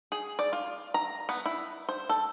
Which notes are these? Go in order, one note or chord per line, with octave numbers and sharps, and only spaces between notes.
G#4
D5
F4
A#5
B3
E4
C5
A4